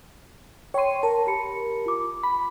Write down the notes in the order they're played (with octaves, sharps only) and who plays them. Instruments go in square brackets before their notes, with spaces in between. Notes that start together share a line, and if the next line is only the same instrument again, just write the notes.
[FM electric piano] C#5 C6 [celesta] G5 D#7
[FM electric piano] A#4 [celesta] A5
[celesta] G4 B5 C#7
F4 D6
[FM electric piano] B5